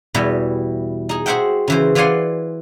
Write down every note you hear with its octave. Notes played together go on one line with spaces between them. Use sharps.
E2 B2 E3 G3
D#4 G#4
F#4 G#4 C5 E5 F#5 G5
C#3 E3 C5
E3 F4 D5 F#5 G#5 C6